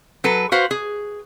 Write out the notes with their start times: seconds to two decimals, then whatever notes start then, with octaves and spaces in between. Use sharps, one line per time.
0.24 F#3 A4 B4
0.52 F#4 B4 C5 F5
0.71 G#4